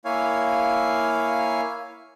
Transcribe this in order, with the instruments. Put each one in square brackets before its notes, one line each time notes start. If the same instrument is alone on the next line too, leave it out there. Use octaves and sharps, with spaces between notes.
[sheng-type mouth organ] A#3 E4 C#5 F5 G#5